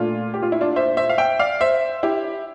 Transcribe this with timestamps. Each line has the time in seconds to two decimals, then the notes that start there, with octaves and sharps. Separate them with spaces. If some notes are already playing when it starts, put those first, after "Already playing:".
Already playing: A#2 A3 D4 F4
0.34 G4
0.43 F4
0.52 E4
0.61 D4 F4
0.76 C5 E5
0.97 C5 E5
1.09 F5
1.18 E5 G5
1.39 D5 F5
1.60 C5 E5
2.03 E4 G4